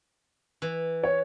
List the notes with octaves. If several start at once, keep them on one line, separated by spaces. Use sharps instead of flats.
E3
C#5